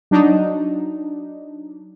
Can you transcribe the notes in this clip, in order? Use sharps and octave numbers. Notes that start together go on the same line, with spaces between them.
F#3 D4 D#4